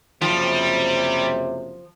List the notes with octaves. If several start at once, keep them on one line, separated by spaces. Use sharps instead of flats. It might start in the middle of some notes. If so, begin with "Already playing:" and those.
F#1 C3 F3 G3